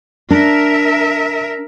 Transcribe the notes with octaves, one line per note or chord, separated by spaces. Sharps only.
D4 A#4 E5